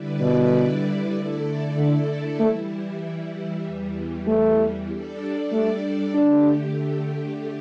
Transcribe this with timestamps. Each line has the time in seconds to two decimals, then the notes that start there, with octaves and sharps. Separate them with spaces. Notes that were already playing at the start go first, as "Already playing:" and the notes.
Already playing: D3 G3 E4 B4 D5
0.21 B2
1.15 D3 A3 E4 A4 D5
1.77 D3
2.39 E3 G3 A3 E4
3.65 E2 E3 G3
4.27 A3
4.90 G3 D4 A4 D5
5.52 A3
6.14 D3 A3 D4 G4